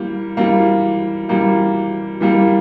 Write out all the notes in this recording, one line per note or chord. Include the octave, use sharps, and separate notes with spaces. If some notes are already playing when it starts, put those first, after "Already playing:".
Already playing: E3 G3 A#3
E3 G3 A#3
E3 G3 A#3
E3 G3 A#3